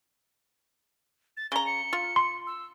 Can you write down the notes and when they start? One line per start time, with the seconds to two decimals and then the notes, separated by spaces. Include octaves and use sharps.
1.37 A6
1.52 C#3 A#5 G7
1.66 C#7
1.93 F4
2.16 C6
2.47 E6